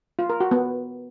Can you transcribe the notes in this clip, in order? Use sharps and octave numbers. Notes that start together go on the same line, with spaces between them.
F4
A#4
F#4
B3